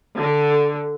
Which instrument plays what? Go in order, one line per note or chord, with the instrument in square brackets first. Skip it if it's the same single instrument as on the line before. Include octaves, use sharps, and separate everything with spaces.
[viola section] D3